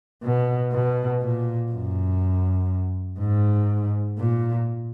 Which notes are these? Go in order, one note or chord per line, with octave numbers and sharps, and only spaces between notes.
B2
B2
A#2
F#2
G#2
A#2